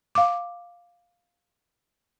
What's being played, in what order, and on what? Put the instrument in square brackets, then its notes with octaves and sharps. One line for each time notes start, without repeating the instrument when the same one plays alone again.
[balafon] F5 D6